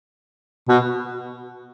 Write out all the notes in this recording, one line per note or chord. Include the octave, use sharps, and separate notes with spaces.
B2